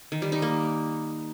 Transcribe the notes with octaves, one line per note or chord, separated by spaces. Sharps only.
D#3
G3
D#4
A#3